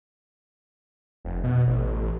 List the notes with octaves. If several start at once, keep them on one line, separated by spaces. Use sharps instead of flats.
F1
B2
A1